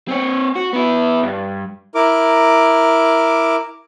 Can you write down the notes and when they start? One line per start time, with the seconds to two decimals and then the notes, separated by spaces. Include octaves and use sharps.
0.08 C4 C#5
0.56 F#4
0.73 B3 E4
1.23 G2
1.95 E4 A#4 D6